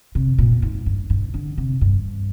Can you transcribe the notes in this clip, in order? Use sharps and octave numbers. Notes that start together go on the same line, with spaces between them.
C3
A#2
G#2
G2
G2
D3
C3
G2